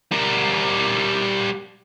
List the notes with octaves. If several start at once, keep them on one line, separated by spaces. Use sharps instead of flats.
G3 A#4